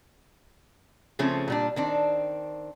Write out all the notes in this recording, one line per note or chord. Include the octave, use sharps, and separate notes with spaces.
C#3 F3 A3 C4 C#4
A#2 G3 D4
D#3 C4 D4